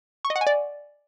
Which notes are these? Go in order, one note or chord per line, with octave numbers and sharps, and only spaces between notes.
C#6
D#5
F#5
G#5
D5